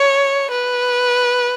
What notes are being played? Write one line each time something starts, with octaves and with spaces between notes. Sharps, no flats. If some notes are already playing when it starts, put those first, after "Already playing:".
Already playing: C#5
B4